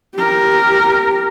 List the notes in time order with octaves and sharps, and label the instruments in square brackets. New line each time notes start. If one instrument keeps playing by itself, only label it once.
[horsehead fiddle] G4 A#4